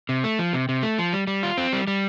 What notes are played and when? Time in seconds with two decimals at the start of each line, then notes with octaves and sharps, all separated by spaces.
0.09 C3
0.24 A3
0.39 F3
0.53 C3
0.69 C3
0.83 A3
0.98 F3
1.13 G3
1.27 G3
1.43 F4
1.57 C4
1.73 G3
1.87 G3